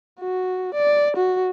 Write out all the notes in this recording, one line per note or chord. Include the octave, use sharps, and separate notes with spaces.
F#4
D5
F#4